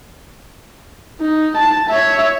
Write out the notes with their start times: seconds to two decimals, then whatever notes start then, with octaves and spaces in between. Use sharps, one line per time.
1.21 D#4
1.57 A5
1.89 C#5 E5